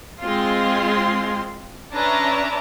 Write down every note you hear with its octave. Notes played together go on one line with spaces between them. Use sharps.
G#3 C4 F4 C6
C#4 D4 B4 E5 A5 A#5